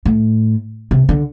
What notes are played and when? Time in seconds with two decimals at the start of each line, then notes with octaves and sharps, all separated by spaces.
0.06 A2
0.91 C3
1.09 D3